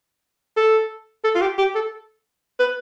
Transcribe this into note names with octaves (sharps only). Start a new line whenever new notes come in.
A4
A4
F4
G4
G4
A4
B4